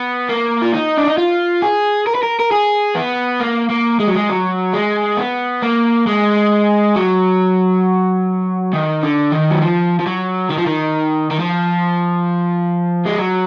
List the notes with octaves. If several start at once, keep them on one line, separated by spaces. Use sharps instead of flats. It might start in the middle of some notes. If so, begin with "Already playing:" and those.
Already playing: B3
A#3
F4
D#4
D4
D#4
F4
G#4
A#4
B4
A#4
A#4
G#4
B3
A#3
A#3
G#3
F#3
G#3
F#3
G#3
B3
A#3
G#3
F#3
D#3
D3
D#3
F#3
F3
F3
F#3
D#3
F3
D#3
D#3
F3
G#3
F#3